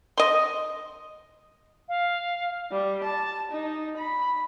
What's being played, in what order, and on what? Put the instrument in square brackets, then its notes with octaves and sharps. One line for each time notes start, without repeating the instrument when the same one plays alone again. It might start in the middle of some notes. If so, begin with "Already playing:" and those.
[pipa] D#5 C6
[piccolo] F5
[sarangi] G3
A5
D#4
B5